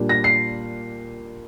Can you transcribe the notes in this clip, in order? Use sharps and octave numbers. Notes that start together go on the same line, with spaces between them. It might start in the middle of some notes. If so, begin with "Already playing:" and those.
Already playing: A#2 G3 D4
A#6
C7